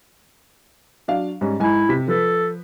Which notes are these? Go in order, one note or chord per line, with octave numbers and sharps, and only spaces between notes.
F#3 D4 F5
G#2 G3 C#4
G#2 E4 G#5
C3 B6
F3 A4 B4